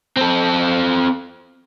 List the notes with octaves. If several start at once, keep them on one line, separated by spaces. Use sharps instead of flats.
C4 A4